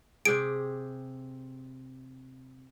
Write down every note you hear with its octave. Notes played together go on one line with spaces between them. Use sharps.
C3 G4 G#4 D7